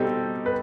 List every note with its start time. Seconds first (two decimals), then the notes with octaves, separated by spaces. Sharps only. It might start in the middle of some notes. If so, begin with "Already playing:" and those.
Already playing: B2 G3 C4 D#4 G4 A4
0.46 B4